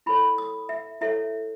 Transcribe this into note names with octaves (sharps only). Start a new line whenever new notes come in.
E4 A4 C#5 B5
D#6
E5
E4 A4 C#5 E5